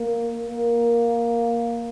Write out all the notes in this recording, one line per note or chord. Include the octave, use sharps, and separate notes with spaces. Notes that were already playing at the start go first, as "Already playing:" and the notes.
Already playing: A#3
A#3